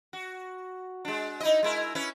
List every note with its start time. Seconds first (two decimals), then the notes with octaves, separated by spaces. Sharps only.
0.13 F#4
1.05 G#3 D4
1.40 D#4 E4 D#5
1.63 G#3 E4 A#4
1.95 C#4 E4 B4